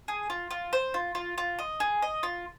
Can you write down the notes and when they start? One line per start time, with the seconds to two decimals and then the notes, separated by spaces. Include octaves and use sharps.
0.08 G#4
0.30 F4
0.51 F4
0.73 C5
0.94 F4
1.15 F4
1.38 F4
1.59 D#5
1.80 G#4
2.02 D#5
2.23 F4